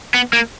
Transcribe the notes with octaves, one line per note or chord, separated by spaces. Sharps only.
B3
A#3